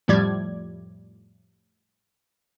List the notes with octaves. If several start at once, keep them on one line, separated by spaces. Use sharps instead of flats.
F2 A2 F3 G3 D5 G#6